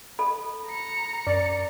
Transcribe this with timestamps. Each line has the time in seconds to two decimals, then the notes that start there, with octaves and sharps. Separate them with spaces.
0.19 A4 B5
0.66 A#5 C#7
1.27 F#2 D5